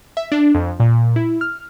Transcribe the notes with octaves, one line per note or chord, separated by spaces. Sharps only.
E5
D4
F2
A#2
E4
F6